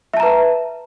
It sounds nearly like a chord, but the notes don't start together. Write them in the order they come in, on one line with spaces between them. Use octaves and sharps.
E5 A5 A#5 B4